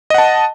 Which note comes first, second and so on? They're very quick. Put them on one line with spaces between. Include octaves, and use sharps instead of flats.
D#5 F#5 A5